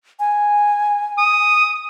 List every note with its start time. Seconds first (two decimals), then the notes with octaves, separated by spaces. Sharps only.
0.20 G#5
1.18 D#6